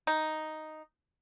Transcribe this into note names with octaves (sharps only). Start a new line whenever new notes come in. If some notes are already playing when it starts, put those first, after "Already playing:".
D#4